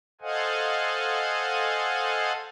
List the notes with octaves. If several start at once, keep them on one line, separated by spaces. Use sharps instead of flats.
A4 C5 D#5 F5 F#5 G#5